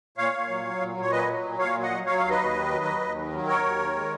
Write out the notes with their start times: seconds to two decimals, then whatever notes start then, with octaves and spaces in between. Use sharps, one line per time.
0.18 A#2 C#5 F5
0.34 A#2
0.49 F#3
0.65 F#3
0.81 A#2
0.97 A#2 C#5
1.11 F#3 B4 D#5
1.28 F#3
1.44 A#2
1.59 A#2 C#5 F5
1.75 F#3
1.82 D#5 F#5
1.90 F#3
2.06 F#3 C#5 F5
2.18 D#2 F5
2.30 B4 D#5
2.38 D#2
2.53 D#3
2.69 F#3
2.85 D#2
3.01 D#2
3.17 D#3
3.32 F#3
3.47 D#2 A#4 C#5
3.63 D#2
3.79 D#3
3.94 G#3